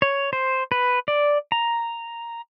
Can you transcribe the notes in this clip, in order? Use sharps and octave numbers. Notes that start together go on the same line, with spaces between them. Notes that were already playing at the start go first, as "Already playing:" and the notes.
C#5
C5
B4
D5
A#5